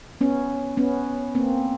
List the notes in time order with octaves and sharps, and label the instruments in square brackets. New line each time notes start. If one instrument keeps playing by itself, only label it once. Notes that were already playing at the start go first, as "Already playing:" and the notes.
[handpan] B3 C#4
B3 C#4
A#3 C4